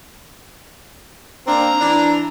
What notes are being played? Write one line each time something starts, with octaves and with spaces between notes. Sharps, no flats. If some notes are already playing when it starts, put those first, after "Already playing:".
A#3 C4 D4 A#5
E3 D4